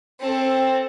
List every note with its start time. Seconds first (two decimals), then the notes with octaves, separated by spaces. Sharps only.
0.20 C4 A4